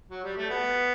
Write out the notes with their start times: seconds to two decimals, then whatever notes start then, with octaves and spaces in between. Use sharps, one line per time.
0.11 F#3
0.24 G3
0.37 A3
0.50 B3